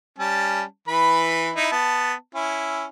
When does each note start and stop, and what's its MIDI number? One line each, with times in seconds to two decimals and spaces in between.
0.19 0.63 55
0.19 0.63 61
0.19 0.63 81
0.88 1.50 52
0.88 1.50 71
0.88 1.50 83
1.56 1.72 63
1.56 1.72 64
1.72 2.14 59
1.72 2.14 81
2.35 2.86 61
2.35 2.86 64